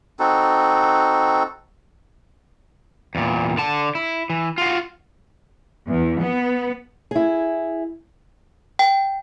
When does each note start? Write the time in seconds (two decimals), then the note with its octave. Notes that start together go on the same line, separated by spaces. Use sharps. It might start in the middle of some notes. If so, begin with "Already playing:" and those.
0.19 C4 D#4 F#4 A4
3.15 E2 A#2
3.58 D3 A5
3.95 E4
4.30 E3
4.58 F4 F#4
5.88 E2
6.22 B3
7.11 E4 G#4
8.79 G5